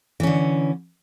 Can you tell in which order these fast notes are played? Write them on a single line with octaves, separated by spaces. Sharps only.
E3 C#4 D3